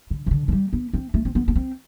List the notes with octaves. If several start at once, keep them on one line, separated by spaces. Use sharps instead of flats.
D3
E3
D3
F3
G3
B3
C4
A3
C4
B3
B3
C4